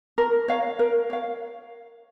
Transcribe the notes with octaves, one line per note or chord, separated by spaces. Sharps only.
A#4
C#5 F5
A#4
C#5 F5